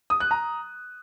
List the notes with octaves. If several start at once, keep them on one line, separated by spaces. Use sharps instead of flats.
D#6
F#6
A#5